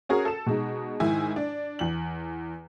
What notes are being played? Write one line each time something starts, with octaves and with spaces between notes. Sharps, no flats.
C#4 F#4 G#4 A#4
A4 E7
B2 G#3 D#4
G#2 D#3 E4 G#5
D4
E2 F#7